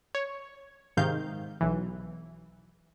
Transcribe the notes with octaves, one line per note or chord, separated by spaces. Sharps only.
C#5
G#2 C3 D#3 F5 G6
B1 E3